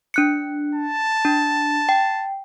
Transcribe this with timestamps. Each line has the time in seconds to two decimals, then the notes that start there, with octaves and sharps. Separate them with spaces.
0.14 D4 F#6 C#7
0.75 A5
1.25 D4
1.89 G5